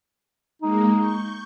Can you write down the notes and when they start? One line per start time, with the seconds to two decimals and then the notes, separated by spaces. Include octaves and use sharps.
0.62 G#3 A#3 D#4
0.97 C#6 G6